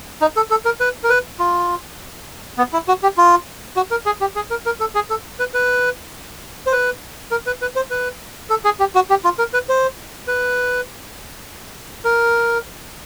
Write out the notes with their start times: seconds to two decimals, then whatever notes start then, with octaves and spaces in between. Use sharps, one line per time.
0.21 D#4
0.36 A4
0.51 A4
0.65 A#4
0.80 B4
1.04 A#4
1.10 B4
1.40 F4
2.58 B3
2.73 E4
2.88 F#4
3.03 G4
3.18 F4
3.76 F#4
3.91 A#4
4.06 G#4
4.21 G4
4.36 G#4
4.50 A#4
4.66 A#4
4.80 A4
4.95 G#4
5.10 A4
5.39 B4
5.54 B4
6.67 C5
6.72 B4
7.31 A#4
7.47 B4
7.62 B4
7.76 C5
7.91 B4
8.50 A4
8.65 G#4
8.80 G4
8.95 F#4
9.10 G4
9.24 F4
9.39 A#4
9.54 B4
9.69 C5
10.28 B4
12.05 A#4